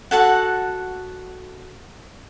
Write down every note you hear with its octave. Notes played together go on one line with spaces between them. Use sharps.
F#4 A4 F#5